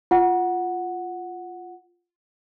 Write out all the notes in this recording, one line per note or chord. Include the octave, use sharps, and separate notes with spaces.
F4 F#5